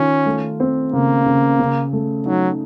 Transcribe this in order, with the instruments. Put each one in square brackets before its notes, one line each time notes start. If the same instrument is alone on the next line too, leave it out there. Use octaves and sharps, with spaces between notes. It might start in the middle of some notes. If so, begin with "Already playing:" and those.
Already playing: [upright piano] D#3 F4 [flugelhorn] C#4
[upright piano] A3
C4
[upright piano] C#3 [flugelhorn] A#3
[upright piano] C#3
C#3
A3
[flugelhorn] F#3 [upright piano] D#4